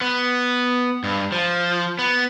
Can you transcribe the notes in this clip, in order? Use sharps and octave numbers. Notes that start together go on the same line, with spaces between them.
B3
G2
F3
B3